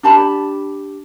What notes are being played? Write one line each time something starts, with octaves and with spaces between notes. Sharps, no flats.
D4 G4 A5 B5